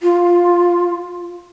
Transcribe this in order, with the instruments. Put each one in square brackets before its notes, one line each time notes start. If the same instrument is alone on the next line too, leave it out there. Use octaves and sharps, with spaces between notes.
[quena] F4